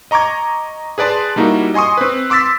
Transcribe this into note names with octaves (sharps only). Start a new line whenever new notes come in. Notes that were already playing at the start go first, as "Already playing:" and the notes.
D#5 A#5 C#6 D6 G#6
G#4 B4 D5 A5 C6
G3 A#3 D#4 E4 F#4
D#5 G#5 C6 C#6 D#6
C4 B4
C6 D6 E6 A6 B6